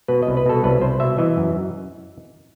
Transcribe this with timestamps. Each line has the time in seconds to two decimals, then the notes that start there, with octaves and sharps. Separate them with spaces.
0.08 B2 B4
0.23 C2 D#5
0.37 B4
0.46 B2 A4
0.64 C2 B4
0.81 C2 C5
1.00 B2 E5
1.18 E3 D#5
1.37 F#2
1.55 F#2